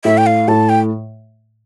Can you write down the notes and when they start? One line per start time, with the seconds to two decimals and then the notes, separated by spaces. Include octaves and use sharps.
0.04 A2 E5
0.18 G5
0.26 F5
0.48 A2 A5
0.69 G5